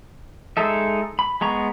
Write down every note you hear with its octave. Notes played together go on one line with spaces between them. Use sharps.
G#3 D#4 A4 E5
B5
G#3 B3 A#5 C#6